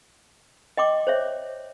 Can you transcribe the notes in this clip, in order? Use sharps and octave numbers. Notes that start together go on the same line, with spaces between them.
D#5 G5 C6 D6
C5 C#5 E5